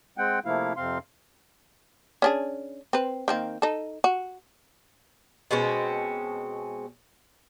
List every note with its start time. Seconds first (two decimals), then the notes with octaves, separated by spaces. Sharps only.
0.18 G#3 C4 F#5 G5
0.45 C3 F3 A3 A#3 E4 F5
0.76 F2 C3 C4 F5 C6
2.22 C#4 D4 G#4
2.93 C4 B4
3.28 D#3 A#3 C4
3.62 D#4 A4
4.04 F#4
5.51 B2 G#3 C4 C#4